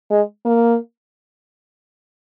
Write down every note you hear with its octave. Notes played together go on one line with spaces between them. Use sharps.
G#3
A#3